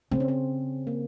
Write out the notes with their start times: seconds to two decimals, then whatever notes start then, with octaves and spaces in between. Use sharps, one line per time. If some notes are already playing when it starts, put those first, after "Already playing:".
0.11 C#3 C4
0.20 C#4
0.28 C4
0.87 A#3